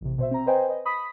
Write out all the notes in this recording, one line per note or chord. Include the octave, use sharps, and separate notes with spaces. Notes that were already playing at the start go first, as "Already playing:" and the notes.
A1 C3
B2 C5 E5
C4 A#5
B4 C5 D#5 G5 G#5
B4 D#5
B5 D#6 B6